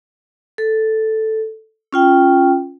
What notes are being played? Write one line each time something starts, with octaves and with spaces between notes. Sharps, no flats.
A4
C#4 F4 G5